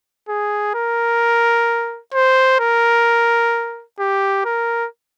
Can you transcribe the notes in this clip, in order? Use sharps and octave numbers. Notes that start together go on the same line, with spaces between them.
G#4
A#4
C5
A#4
G4
A#4